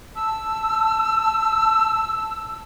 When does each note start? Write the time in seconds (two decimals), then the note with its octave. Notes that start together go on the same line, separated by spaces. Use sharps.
0.16 A5 E6